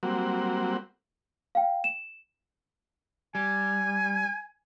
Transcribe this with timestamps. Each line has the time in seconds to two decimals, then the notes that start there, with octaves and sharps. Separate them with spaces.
0.03 F#3 G3 A#3 C4 F#4
1.55 F5 G5
1.84 E7
3.35 G3 G#5